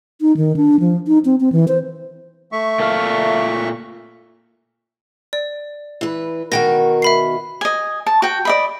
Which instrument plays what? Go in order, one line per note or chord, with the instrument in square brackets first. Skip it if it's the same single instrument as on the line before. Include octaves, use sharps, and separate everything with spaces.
[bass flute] D#4
D#3
D4
F3
D#4
C4
C4
E3
C5
[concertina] A3 E5 C#6
[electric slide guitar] A#2 A4 F5
[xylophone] D5
[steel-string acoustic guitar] E3 B4
[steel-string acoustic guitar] B2 D#3 F#4 [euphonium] A#4 [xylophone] G5 A#6
[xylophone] E5 B5 C7
[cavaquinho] D#5 G#5
A5
F#4 G5
D5 D#5 B5